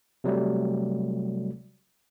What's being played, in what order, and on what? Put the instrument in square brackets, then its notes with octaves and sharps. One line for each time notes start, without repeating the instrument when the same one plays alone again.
[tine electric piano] C3 F#3 G3 A3